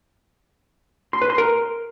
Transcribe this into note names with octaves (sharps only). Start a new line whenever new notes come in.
C6
B4
C6
A#4